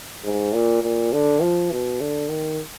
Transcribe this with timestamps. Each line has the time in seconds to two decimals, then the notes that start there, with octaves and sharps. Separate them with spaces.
0.24 G#2
0.53 A#2
0.83 A#2
1.13 D3
1.41 F3
1.71 B2
2.01 D3
2.29 D#3